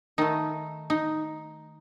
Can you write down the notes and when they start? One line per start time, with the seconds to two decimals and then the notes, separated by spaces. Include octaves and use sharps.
0.18 D#3 A3 D#4
0.90 D#4